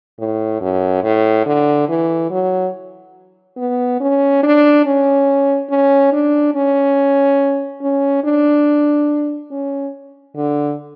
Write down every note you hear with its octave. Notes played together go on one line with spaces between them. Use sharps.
A2
F#2
A2
D3
E3
F#3
B3
C#4
D4
C#4
C#4
D4
C#4
C#4
D4
C#4
D3